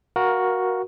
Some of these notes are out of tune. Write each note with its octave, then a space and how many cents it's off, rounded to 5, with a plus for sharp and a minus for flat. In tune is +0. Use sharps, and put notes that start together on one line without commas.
F#4 +0 A#4 +15 F5 +0